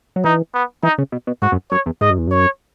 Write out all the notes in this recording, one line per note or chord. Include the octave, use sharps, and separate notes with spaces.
F#3
E3 D#4
B3
E3 D#4
C#3
B2
B2
G#2 F#4
F#2
F#2 C#5
E2
G#2 D#5
F#2
E2
F#2 C#5